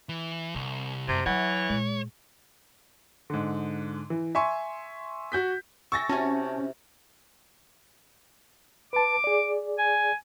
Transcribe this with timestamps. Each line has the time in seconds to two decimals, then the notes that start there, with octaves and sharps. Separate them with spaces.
0.09 E3
0.55 C2 C4
1.08 F#2 C3
1.26 E3 F#3 C#5 E5 F#5
1.70 A#2 G#3
3.30 G#2 D3
4.10 E3
4.35 E5 G#5 C6 C#6
5.32 F#4 G6 B6
5.92 E5 G5 G#5 C#6 E6 A6 A#6
6.09 C3 C#4 E4 F#4 G#5 A5
8.93 B4 A5 D6
9.24 G#4 D5
9.78 G#5